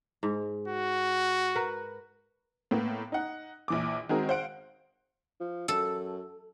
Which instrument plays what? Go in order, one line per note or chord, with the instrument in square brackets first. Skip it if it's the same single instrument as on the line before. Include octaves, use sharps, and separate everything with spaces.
[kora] G#2
[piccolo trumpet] F#4
[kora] A#4 B4
[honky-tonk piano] A2 A#3 B3
D#4 F#5
A#1 E3 D6
D#3 G#3 C4 F#4 G#4 A#4
C5 F5 F#5 D7
[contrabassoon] F3
[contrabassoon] F#2 [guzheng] A4